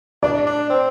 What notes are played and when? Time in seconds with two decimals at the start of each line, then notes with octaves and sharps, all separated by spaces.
0.23 D4 D5
0.46 D4
0.70 C4